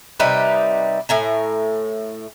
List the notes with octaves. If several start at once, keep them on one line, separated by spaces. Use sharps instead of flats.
C3 G3 D#4 B4
A2 G#5 A#5